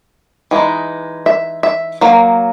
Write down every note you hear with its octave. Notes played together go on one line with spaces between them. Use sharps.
E3 G#3 D#4
E5
E5
F#3 A#3